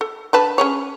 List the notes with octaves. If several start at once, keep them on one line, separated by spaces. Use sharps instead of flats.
A4
D3 B4 A5
C#4 G#4 C#5